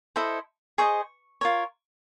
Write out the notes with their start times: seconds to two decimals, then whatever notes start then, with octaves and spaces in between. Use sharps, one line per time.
0.16 E4 A4 C5 D#5
0.78 G#4 C5 D#5 C#6
1.41 F4 A#4 C#5